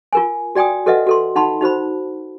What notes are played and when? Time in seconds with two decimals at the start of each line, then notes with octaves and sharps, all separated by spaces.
0.13 F4 A#4 G#5
0.55 F#4 D5 G5 G#5 D#6
0.86 F#4 A4 B4 D#5 E5 F#5
1.07 F#4 A4 C6
1.36 D#4 F#5 A5 B5 C6
1.61 D#4 F#4 C5 B5